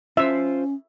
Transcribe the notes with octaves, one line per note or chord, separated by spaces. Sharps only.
C#4 F4 C5 E5